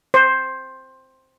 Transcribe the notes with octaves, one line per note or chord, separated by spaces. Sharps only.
C5